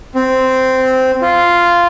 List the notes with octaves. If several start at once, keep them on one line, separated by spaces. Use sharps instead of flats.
C4
F4